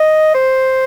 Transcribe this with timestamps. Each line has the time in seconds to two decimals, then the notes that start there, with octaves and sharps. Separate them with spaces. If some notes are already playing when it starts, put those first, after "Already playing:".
Already playing: D#5
0.34 C5